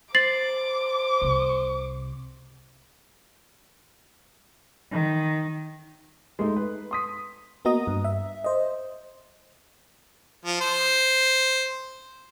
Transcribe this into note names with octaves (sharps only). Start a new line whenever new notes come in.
C5 D6 A6 C7 F#7
C2 C3
D#3
G#3 A3 D#4
B4
C6 D#6 B6
A#3 B3 F#4 D#5 A#5 D#6
G2
E5
C5 D#5
F3
C5